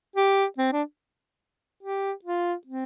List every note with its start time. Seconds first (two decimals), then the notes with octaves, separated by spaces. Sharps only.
0.16 G4
0.58 C4
0.72 D4
1.83 G4
2.25 F4
2.67 C4